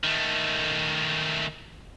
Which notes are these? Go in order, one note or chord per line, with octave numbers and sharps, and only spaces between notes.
D#3 A3